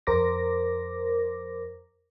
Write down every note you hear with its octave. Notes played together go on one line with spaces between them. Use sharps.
F2 A#4 C5 D6 A#6